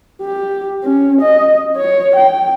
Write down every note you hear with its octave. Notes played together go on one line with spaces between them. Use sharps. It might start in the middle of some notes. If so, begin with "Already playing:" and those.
G4
C#4
D#5
C#5
G5